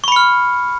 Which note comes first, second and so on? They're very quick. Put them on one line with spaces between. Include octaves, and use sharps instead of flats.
C#6 B5 C#7 F6